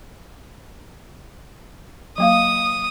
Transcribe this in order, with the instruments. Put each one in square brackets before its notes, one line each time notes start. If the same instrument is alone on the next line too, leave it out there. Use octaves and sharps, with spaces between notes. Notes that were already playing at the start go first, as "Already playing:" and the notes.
[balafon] F#3 A#3 F5 [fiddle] D#6